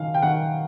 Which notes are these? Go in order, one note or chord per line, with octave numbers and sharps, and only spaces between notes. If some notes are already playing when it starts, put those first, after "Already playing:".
Already playing: F#2 D#3 F5
G5
D#3 F#5